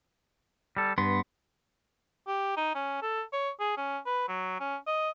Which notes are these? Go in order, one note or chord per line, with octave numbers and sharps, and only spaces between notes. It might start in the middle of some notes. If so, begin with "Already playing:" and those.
G3 A4
G2 B3 C6
G4
D#4
C#4
A4
C#5
G#4
C#4
B4
F#3
C#4
D#5